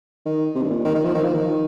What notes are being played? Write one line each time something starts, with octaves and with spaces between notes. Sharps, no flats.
D#3
C3
G2
A#2
D#3
D#3
F3
D#3
F3
D#3